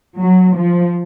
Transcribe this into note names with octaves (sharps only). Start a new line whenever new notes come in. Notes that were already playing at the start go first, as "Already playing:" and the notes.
F#3
F3